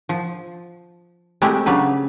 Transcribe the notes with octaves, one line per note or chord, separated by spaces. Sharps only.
F3
G#3 A3 C4 E4 G4
C#3 F#3 D4 B4